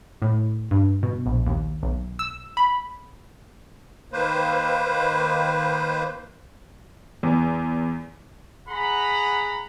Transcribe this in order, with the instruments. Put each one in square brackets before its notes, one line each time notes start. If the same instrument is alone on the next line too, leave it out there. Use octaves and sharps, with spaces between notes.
[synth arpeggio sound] A2
G2
B2
A#1
D#2
B1
E6
B5
[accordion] D#3 A#3 B4 C5
[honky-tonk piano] E2
[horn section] G#4 F#5 A#5 B5